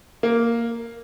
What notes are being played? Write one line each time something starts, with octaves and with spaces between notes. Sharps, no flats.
A#3